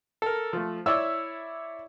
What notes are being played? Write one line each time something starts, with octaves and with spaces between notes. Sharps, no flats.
A4 A#4
F3 A3
E4 C#5 D5 E6